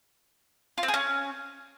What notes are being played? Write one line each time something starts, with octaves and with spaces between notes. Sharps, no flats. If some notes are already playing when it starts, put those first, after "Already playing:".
F4
C4
G#4
C#4